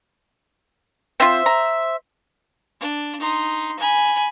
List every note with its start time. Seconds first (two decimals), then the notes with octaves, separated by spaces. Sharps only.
1.20 C4 F4 C5 E5
1.46 A#5
2.80 D4
3.20 D#4 C6
3.79 G#5 B5